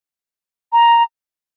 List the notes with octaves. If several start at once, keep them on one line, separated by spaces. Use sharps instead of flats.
A#5